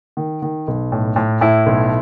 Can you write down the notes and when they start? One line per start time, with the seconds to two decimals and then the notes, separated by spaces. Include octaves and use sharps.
0.17 D#3
0.42 D#3
0.68 B1
0.92 A2
1.16 A2
1.41 A2 E4
1.66 B1